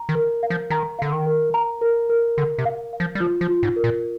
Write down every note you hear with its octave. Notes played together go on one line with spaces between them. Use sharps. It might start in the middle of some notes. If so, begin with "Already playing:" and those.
Already playing: A#5
D#3
A#4
F5
F3
D#3 A#5
D3 F5
D#3
A#4
A#5
A#4
A#4
D3 A#4
C3
F5
F5
F3
G3
F3 F4
F3
F4
G#2
A#4
A#2